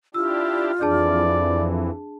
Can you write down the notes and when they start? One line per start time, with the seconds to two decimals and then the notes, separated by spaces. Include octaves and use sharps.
0.14 D4 E4 F4 G4 E6
0.81 F2 E3 D4 G#4 D5 A5